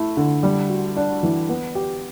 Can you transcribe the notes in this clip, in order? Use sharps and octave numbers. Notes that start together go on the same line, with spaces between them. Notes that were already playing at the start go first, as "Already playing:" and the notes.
Already playing: A3 E4
D3
G3
F#4
D4
E3
B3
G4